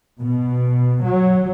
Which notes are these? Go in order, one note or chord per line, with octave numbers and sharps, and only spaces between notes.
B2
F#3